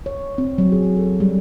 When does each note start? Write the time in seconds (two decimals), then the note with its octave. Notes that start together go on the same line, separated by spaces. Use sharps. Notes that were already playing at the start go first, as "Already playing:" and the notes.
0.06 C#5
0.38 C4
0.58 F#3
0.72 G#4
0.97 A4
1.20 G3